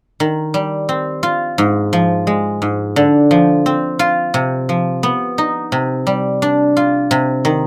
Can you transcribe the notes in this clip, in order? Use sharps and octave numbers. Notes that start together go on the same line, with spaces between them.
D#3
G3
C4
F4
G#2
F3
G#3
G#2
D3
F3
C4
F4
C3
F3
B3
D#4
C3
G3
D4
F4
C3
D#3